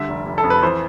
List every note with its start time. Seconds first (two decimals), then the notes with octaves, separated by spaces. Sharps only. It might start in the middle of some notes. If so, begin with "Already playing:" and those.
Already playing: D3 G3 E5
0.08 F1
0.26 F1
0.38 A4
0.44 F2
0.50 B4
0.62 E3 C5